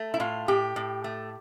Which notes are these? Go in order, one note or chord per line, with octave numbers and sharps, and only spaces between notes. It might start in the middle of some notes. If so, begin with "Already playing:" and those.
Already playing: A3
E4
A2 F4
A2 G4
A2
A3